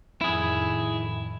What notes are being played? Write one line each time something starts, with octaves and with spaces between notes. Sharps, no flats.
F2 A2 D#3 E4 G#4